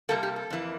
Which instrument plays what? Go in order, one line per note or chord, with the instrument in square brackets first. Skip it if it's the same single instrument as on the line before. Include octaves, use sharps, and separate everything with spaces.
[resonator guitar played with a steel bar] C3 G3 A#3 A4
G4
A4
F2 E3 A#3